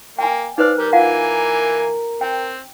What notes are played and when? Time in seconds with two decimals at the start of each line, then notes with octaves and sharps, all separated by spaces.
0.19 A#3 G5 G#5
0.58 D#4 B4 C5 D5 F5
0.78 G3 A#4
0.93 E3 A#3 F4 F5 F#5 G#5
2.21 C4 G5